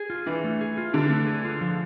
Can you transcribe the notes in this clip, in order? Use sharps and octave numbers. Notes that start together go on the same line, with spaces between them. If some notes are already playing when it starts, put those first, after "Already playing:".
Already playing: G#4
F4
E3 D4
A3
G#4
F4
D3 D4
A3
G#4
F4
F3